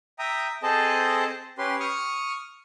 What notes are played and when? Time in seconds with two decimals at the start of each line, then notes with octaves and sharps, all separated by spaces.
0.19 E5 G5 A#5 D#6
0.63 C4 G#4 A4 C5 D#5 A5
1.58 C#4 G4 B4 C6
1.80 C#6 D#6 F6